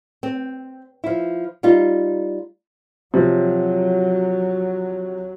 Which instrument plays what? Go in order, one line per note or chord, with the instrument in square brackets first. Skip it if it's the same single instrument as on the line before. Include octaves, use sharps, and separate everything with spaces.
[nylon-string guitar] C4
F3 E4
G3 D#4 F4
[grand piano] C3 F3 [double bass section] F#3